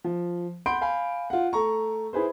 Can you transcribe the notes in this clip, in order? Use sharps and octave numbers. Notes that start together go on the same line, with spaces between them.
F3
F#5 B5 C6 G6 D7
F5 G#5 B5
F4 F#5
A3 A4 A#5 C#6
E4 G#4 B4 C5